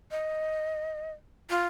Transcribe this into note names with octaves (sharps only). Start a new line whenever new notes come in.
D#5
F4